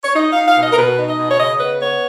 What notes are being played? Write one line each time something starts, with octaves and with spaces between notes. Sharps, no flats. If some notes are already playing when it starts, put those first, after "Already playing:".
C#5
D#4 D#5
F5
D#4
F5
B2 D#5
A#4
B2 B4
D#4
D#5
B2
C#5
C#3 D#5
B3 B4
B3 C#5